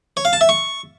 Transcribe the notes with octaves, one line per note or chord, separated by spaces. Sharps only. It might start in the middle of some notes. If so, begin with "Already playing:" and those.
C#5
F5
A5
E5
C#6